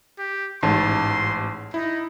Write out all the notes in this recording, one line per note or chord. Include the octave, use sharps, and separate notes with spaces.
G4
A1 G#2 A5 C6
D#4 E4